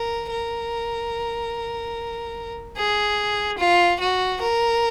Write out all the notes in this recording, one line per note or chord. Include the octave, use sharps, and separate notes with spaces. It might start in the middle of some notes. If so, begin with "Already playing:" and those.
Already playing: A#4
A#4
G#4
F4
F#4
A#4